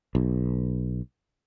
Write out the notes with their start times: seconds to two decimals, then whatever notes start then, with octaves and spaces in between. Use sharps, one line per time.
0.15 B1